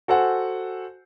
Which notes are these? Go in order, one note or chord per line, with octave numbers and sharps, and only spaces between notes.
F#4 A4 C5 F#5 G#5